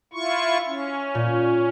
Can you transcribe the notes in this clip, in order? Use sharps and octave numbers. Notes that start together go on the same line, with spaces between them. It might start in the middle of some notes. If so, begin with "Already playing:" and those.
E4 F4 C#6
C#4
A#2